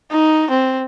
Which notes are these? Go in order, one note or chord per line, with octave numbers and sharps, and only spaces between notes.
D#4
C4